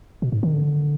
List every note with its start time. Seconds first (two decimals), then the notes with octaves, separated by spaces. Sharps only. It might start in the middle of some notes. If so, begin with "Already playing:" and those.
0.22 B2
0.32 G#2
0.43 D#3
0.53 D3